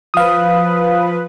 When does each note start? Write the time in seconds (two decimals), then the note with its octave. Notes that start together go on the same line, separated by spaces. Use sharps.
0.14 F3 B4 F5 D#6